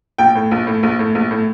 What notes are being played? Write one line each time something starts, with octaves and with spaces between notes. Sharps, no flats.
A#1 G5
A2
A#1
A2
A#1
A2
A#1
A2